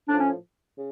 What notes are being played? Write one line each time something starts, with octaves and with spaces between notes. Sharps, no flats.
A2 F3 D4
C#4
C#3